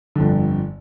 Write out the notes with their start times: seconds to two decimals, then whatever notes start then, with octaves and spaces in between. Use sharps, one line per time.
0.16 G1 F2 D3